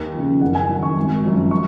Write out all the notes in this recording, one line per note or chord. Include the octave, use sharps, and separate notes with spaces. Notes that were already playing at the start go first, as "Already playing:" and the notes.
Already playing: D#2
C#3 F3
F#1 F#5
G#5
F#2 D#3
C#6
G#1
F#2 F3
C#6